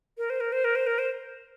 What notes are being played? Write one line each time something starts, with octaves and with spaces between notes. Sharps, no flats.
A#4
C5
A#4
C5
A#4
C5
A#4
C5